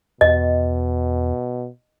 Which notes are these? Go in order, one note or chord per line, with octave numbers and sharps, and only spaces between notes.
E2 B2 D#5